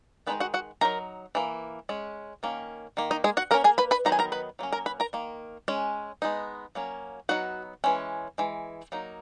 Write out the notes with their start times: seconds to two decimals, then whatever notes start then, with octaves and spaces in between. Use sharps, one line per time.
0.27 D#3 G#3 B3 D#4 B4
0.40 F#4 F#5
0.54 F#4 F#5
0.81 F#3 A#3 D#4 A#4 A#5
1.35 E3 A#3
1.89 G#3 C#4
2.43 D#3 A#3 C#4
2.97 D#3 A#3
3.11 D#4 D#5
3.24 G#3 G#4
3.37 F#4 F#5
3.51 E3 A#3 C#4 A#4 A#5
3.64 G#4 G#5
3.78 B4 B5
3.91 B4 B5
4.05 D#3 F#3 B3 D#4 A#5
4.12 G#5
4.19 A#4 A#5
4.32 B4 B5
4.59 F#3 A#3 C#4
4.73 A#4 A#5
4.86 B4 B5
5.00 A#4 A#5
5.13 D#3 A#3
5.68 G#3 C#4
6.22 G#3 B3 D#4
6.75 F#3 A#3 C#4
7.29 F#3 B3 D#4 F#4 F#5
7.84 E3 G#3 C#4
8.38 E3 G#3
8.92 F#3 A#3 D#4